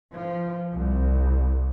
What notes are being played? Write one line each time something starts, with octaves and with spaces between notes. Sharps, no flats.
F3
C2